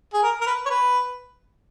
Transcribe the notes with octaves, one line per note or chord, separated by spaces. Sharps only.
G#4
A#4
A#4
B4
C#5
B4